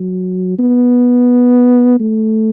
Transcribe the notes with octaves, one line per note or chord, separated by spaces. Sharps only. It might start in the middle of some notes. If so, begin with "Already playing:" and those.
Already playing: F#3
B3
A3